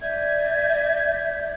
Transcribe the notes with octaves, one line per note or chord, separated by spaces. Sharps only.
D5 E5 G6 G#6